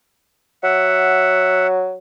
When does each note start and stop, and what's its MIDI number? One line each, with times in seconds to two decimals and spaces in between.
0.63 1.97 54
0.63 1.67 76
0.63 1.67 78